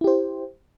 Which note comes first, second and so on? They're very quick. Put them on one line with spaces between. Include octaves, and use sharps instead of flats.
E4 G4 C5